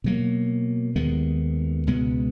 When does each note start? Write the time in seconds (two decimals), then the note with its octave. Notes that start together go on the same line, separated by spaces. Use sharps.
0.04 B2 F#3 A#3
0.96 D#2 D#3 G#3 B3
1.87 C#2 B2 G#3 B3